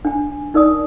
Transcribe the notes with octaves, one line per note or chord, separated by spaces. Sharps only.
D4 G#5
D#4 A#4 D5 D#6